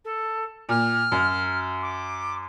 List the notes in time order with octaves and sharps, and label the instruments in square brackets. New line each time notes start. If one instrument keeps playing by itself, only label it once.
[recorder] A4
[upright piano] A#2 [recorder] F6
[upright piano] F#2
[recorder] D6